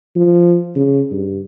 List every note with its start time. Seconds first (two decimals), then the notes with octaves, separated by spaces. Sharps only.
0.16 F3
0.75 C#3
1.12 G2